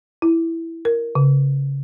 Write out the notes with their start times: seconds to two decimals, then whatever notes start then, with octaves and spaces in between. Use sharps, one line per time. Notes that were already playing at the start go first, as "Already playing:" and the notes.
0.22 E4
0.85 A#4
1.15 C#3